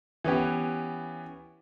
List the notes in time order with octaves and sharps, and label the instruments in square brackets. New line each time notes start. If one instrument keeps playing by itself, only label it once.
[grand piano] E3 B3 C#4 G4